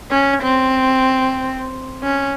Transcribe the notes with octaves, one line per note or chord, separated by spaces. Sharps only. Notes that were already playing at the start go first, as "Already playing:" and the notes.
C#4
C4
C#4